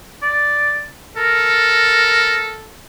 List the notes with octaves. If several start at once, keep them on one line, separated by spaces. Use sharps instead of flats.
D5
A4 A#4